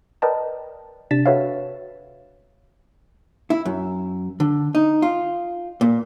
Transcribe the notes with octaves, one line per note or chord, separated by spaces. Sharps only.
A#4 B4 D5 D#5 G5 A5
C3 D4 A6 B6 E7
F#4 A4 B4 C#5 E5 F5
E4
F#2
D3
D#4
F4
A#2